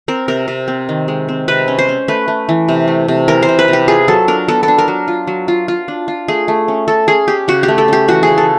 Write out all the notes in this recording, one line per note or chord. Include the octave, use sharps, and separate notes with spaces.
C4 A#4
C3 A#4
C3
C4
D#3
G#3
C4
C3 B4
C#4
C5
C#4
A3 B4
A3
E3
C3
A3
C3
E3 A#4
C5
C3
B4
C3
G4
F4 G#4
F#3 A4
D4 A#4
B3 A4
A4
D4
A#4
F#3
F4
F#3
F4
F4
D4
F4
A3 G#4
A3
C#4
C#4 A4
C#4 G#4
C#4 G4
C#3 F#4
G4
A3
A4
C#4 G4
E3 F#4
C#3 G#4
A4